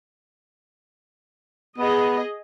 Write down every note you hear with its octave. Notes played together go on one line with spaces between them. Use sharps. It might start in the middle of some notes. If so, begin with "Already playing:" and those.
B3 G#4 D#5